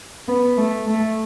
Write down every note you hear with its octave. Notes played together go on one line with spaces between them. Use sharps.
B3
A3
A3